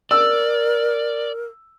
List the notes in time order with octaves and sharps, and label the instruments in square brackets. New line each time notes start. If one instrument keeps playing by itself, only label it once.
[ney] A#4 [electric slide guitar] D5 [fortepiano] E6